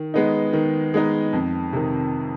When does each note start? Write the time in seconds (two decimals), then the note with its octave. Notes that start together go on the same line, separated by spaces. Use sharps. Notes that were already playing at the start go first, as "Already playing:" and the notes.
Already playing: D#3
0.14 G#3 B3 D#4
0.53 D#3
0.94 G#3 B3 D#4
1.33 F2
1.73 C3 D#3